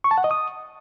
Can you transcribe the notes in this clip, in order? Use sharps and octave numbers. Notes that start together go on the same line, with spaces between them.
C#6
A5
F#5
D#5
D#6